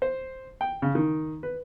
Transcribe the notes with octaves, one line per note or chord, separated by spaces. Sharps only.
C5
G5
C#3
D#3
B4